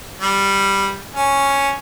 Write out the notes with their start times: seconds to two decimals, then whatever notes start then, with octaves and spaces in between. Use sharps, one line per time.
0.21 G3
1.15 C#4